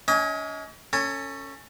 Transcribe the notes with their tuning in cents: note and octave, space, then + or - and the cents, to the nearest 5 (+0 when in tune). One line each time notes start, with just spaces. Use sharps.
C#4 +45 D#5 +40 G#5 -10
C#4 +0 A4 +30 G#5 +0